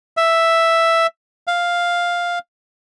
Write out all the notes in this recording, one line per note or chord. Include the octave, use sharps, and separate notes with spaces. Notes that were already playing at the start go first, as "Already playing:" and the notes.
E5
F5